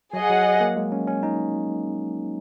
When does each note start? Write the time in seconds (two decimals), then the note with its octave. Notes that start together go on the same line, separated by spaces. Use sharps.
0.13 F#3 G#4 D#5 F#5
0.30 F#3
0.61 A#3
0.77 G#3
0.92 C#4
1.07 C#4
1.23 D#4